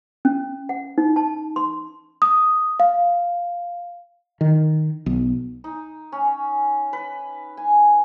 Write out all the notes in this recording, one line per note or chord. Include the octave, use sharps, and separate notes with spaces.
C#4
F#5
D#4
A5
C6
D#6
F5
D#3
B1
D#4
C#4
B4
G#5